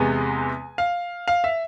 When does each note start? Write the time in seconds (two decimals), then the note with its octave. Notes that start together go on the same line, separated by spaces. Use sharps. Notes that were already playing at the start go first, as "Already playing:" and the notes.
Already playing: E2 C3 G#3 B3 G#5
0.78 F5
1.28 F5
1.44 E5